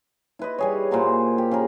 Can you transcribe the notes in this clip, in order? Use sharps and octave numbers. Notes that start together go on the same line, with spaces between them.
E4 B4 D#5
G3 G#4 C#5
A#2 C5 F#5 A#5
G4
C#3 G#4 A#4